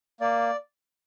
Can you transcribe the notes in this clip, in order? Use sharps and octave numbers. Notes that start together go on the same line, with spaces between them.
A#3 D5